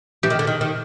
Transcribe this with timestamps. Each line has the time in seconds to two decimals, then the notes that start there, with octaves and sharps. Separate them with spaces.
0.23 E3 G4
0.30 D#3
0.39 D3
0.47 D#3
0.61 D#3